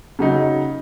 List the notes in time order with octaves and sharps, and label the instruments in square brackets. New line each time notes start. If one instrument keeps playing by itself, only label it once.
[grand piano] C#3 F#3 D#4